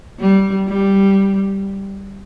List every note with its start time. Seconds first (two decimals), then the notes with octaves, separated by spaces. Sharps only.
0.19 G3
0.68 G3